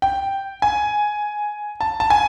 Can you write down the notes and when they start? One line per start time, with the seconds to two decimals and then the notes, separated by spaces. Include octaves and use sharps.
0.02 G5
0.62 G#5
1.81 A5
2.00 A5
2.10 G#5